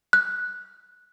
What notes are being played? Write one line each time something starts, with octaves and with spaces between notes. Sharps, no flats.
F#6